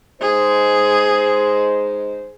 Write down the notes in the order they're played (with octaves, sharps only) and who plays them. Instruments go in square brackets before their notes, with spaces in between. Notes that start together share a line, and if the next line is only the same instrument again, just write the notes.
[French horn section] G#3 D#4 C5 [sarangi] G#4